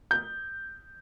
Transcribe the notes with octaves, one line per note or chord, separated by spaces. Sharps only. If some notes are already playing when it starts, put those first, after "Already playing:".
G6